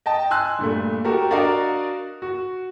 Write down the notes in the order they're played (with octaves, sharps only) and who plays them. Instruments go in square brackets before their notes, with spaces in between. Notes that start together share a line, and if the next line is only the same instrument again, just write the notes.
[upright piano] D#5 G5 A5
G#5 C6 E6 F#6
G2 A#2 A3
F#4 G4 A4 A#4
D4 F#4 A#4 D5 D#5 F5
F#4